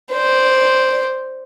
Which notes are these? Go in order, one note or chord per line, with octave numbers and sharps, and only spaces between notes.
C5 D5